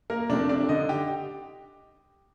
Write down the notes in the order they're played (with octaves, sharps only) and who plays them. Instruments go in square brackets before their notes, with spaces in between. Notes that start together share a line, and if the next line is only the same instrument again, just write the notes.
[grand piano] A#3 A#4
C3 F3 A3 C4 D4 D5
D4 D5
D3 D#4 D#5
G4 G5